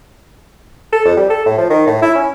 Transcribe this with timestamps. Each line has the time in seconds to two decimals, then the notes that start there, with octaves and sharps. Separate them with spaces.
0.93 A4
1.05 F2
1.17 G3
1.30 A4
1.46 A2
1.58 F3
1.70 D#3
1.87 A2
2.02 E4
2.15 C#4